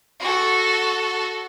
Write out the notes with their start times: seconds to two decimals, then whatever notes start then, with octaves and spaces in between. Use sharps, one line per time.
0.20 F#4 A4